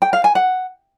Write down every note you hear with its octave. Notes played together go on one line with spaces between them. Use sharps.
G5
F5
G#5
F#5